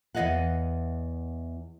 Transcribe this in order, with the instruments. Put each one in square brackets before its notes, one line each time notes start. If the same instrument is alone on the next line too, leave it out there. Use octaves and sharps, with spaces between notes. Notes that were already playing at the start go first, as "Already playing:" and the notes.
[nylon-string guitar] E2 B4 C#5 D#5 F5 F#5